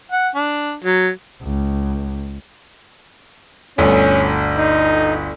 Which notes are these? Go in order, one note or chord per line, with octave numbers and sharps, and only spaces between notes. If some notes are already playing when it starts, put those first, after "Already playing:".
F#5
D4
F#3
C#2
G1 D2 C#4
D#4